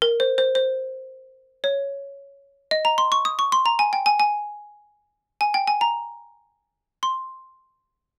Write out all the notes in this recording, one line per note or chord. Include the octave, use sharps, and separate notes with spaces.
A#4
C5
C5
C5
C#5
D#5
A#5
C6
C#6
D#6
C#6
C6
A#5
G#5
G5
G#5
G#5
G#5
G5
G#5
A#5
C6